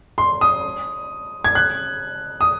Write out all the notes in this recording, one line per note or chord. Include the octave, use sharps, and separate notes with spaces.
C6
D#6
G#6
F#6
D#6